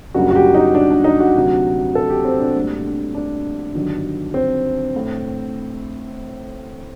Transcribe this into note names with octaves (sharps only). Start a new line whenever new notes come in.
F#1 F#2 D3 G3 F#4
F#4
G4
D#4
D4
D4
D#4
F#4
D2 C3 F#3
A4
G4
C4
D4
A#1 A2 G3
D4
G1 G2 D#3 F#3
C4
A2